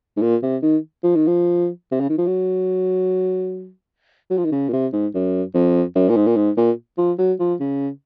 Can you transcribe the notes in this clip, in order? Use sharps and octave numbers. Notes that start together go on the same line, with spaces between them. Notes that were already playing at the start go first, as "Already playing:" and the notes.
G#2
A#2
C3
D#3
F3
D#3
F3
C3
C#3
D#3
F3
F#3
F#3
F3
D#3
C#3
A#2
C3
G#2
F#2
F2
F#2
A#2
G#2
A#2
G#2
A#2
F3
F#3
F3
C#3